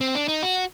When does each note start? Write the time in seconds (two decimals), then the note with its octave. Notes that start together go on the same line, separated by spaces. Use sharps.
0.01 C4
0.15 D4
0.28 D#4
0.43 F#4